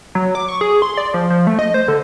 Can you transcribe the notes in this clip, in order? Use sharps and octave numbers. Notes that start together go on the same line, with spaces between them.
F#3
D6
C#6
G#4
C6
D5
F3
F3
A3
D#5
C5
D3